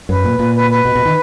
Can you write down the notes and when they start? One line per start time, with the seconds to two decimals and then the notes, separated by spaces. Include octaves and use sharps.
0.09 F#2 B4
0.24 A#2
0.39 A#2
0.54 B4
0.70 B4
0.85 B2
0.95 B2
1.05 D#3